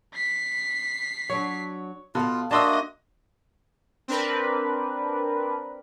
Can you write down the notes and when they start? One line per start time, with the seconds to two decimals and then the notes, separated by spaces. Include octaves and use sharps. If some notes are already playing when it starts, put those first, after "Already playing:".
0.15 B6 C7
1.30 F#3 D4 C#5
2.15 B2 F4 A4 F5
2.51 A#3 D4 F#4 D#5 E5 A5 C6 E6
4.08 C4 D4 A#4 B4